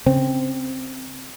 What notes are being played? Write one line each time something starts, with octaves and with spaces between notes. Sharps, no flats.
C#3 C4